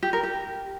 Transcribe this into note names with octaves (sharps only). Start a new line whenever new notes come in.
G4
A#4
G4